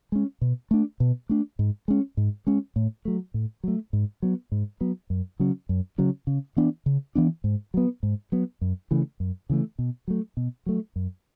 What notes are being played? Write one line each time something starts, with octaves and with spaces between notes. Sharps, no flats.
G#3 C#4
B2
A3 D4
B2
A3 D4
G#2
G#3 C#4
G#2
G#3 C#4
A2
F#3 A3
A2
F#3 A3
G#2
F#3 B3
G#2
F#3 B3
F#2
C#3 F#3 C#4
F#2
C#3 F#3 C#4
C#3
E3 B3 D4
C#3
E3 B3 D4
G#2
F#3 B3
G#2
F#3 B3
F#2
C#3 E3 A3
F#2
C#3 E3 A3
B2
F#3 A3
B2
F#3 A3
F#2